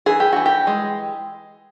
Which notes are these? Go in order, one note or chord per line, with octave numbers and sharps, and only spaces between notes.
E3 G#4
G4
E3 F#4
G4
G#3